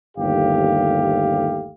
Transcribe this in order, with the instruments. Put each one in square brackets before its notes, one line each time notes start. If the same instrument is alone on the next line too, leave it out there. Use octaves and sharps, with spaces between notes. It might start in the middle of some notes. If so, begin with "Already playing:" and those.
[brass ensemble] G1 D#2 A3 G4 F5